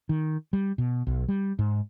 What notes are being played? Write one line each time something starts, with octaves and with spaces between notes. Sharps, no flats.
D#3
G3
B2
B1
G3
G#2